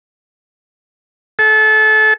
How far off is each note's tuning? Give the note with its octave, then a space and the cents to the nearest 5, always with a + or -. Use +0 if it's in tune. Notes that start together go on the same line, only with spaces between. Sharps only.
A4 -30